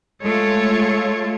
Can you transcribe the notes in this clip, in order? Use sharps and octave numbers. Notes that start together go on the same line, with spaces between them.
G#3 A3 F4 A4 C#5